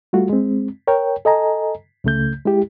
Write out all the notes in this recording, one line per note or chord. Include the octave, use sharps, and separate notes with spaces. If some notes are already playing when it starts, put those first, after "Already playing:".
G3 A3 F4 F#4
G#3 C4
A#4 C#5 G5
A4 D#5 G#5 A#5
C#2 C#3 A3 G6
G#3 E4 G4